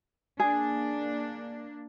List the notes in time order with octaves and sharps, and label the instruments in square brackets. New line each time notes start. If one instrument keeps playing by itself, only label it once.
[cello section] A#3 D4 [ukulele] G#4